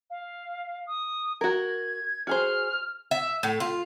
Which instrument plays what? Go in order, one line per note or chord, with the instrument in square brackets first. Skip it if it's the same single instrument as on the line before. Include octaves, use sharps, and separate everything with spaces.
[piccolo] F5
D#6
[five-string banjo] F#4 A#4 [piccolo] G#6
[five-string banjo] F#4 G#4 C5 [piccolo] F6
[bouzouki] E5
A2
F4